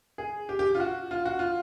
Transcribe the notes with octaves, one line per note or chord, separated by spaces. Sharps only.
G#4
G4
G4
F4
F#4
F4
F#4
F4